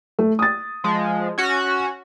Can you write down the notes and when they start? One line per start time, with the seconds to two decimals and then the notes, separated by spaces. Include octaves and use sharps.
0.19 A3
0.39 D#6 A6
0.84 F3 G#3
1.38 C#4 F#4